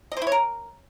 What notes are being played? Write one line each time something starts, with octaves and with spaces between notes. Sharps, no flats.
D#5
C5
E4
C#5
A#4